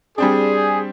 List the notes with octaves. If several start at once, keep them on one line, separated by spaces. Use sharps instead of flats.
G3 C4 D4 G#4